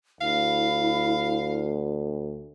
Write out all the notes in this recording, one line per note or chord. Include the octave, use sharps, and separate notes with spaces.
D2 E4 F5